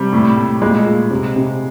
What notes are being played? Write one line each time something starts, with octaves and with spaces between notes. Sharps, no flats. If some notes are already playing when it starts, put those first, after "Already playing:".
Already playing: C3 G3
A2
A2
A#2 G#3
A#2
C3
C3